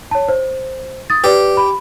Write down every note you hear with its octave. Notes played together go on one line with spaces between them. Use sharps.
C#5 A5
C5
D#6 A6
G4 B4 D5
B5